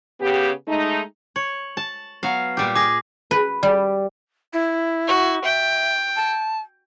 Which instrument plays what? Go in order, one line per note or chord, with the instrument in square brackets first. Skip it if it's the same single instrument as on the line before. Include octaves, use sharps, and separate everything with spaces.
[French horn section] C#3 B3 G4
G#3 A3 D#4
[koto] C#5 [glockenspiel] F#7
[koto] A5
F#3 B3 F5
A#2 G3 G4
[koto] G#4 [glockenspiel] D6 A#6
[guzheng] B4
G3
[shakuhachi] E4
[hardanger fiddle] F#4
[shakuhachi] E5 [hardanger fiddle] G5
[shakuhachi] A5